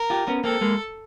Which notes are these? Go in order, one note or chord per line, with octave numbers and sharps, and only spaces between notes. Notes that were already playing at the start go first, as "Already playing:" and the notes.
Already playing: A#4
F4 G4
B3 C#4
A#3 C4 A4
G#3 A#3